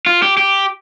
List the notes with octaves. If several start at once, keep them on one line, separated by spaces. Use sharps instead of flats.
F4
G4
G4